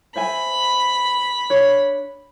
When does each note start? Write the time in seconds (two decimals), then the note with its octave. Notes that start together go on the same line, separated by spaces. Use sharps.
0.16 C5 E5 G#5 B5
1.50 D4 C#5